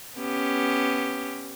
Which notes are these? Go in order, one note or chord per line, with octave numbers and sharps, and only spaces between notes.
B3 C#4 G4